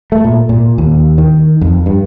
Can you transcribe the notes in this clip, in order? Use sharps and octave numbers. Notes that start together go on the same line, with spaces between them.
A3
A#2
A#2
D#2
D#3
F2
G2